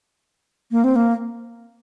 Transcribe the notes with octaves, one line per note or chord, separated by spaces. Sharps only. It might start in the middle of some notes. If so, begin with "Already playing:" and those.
A#3
C4
A#3